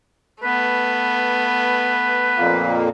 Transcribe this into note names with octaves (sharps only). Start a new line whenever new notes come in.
A3 B3 B4
F2 A#2 A#3